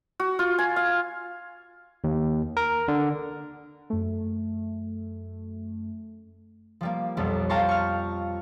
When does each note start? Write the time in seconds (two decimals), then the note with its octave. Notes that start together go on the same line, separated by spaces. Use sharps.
0.20 F#4
0.39 F4
0.59 G#5
0.76 F5
2.04 D#2
2.57 A#4
2.88 D3
3.90 F#2 A3
6.81 F3 G3 A#3
7.17 B1 F2 G3
7.49 F5 G5 A5 A#5 C6 C#6
7.69 C#6 F6